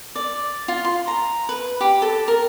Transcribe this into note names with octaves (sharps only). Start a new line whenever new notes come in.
D5
F4
C6
A#5
B4
G4
A4
A#4